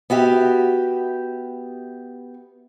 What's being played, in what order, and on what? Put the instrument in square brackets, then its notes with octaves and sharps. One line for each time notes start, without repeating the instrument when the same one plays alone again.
[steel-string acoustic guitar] B3 F#4 G4 E5